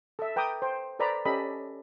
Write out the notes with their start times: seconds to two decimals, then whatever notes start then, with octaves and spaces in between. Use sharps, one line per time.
0.19 A4 E5
0.36 B4 G5 A#5 D6 D#6
0.62 C5 G5
0.99 A4 B4 C5 D5 A#5 B5
1.25 C#4 G4 A4 D#5 B5